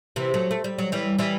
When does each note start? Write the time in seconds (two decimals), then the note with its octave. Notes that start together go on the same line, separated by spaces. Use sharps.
0.16 C3 E3
0.34 F#3 A3
0.51 A3
0.64 G3
0.78 F#3
0.92 E3 G3
1.19 E3 G3